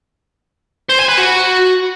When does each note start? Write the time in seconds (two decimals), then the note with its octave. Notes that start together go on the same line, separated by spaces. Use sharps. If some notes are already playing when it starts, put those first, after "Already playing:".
0.90 C5
0.99 G#5
1.08 B4
1.18 F#4